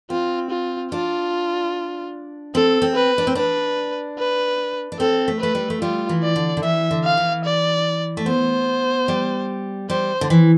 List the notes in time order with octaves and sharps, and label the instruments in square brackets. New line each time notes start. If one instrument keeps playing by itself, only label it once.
[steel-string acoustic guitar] C4 [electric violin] F4
[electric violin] F4
[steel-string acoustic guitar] D4 [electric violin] F4
[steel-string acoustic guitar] C4 [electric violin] A4
[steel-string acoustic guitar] C4
[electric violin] B4
[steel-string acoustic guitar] D4
C4
[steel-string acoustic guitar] D4 [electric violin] B4
[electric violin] B4
[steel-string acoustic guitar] D4
[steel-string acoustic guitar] C4 [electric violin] A4
[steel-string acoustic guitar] A3
[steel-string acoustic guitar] A3 [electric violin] B4
[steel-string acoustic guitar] G3
A3
[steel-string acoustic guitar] G3 [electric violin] F4
[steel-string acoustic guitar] E3
[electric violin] D5
[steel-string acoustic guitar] D3
D3
[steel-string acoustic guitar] E3 [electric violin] E5
[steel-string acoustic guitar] D3
[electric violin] F5
[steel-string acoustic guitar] E3
[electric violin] D5
[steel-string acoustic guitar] A3
[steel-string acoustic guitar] B3 [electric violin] C5
[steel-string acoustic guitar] G3
[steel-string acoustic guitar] G3 [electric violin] C5
[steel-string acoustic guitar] D3
E3